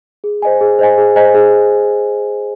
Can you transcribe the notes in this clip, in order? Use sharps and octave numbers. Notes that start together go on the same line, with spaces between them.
G#4
C5 D#5 G#5
G#4
C5 D#5 G#5
G#4
C5 D#5 G#5
G#4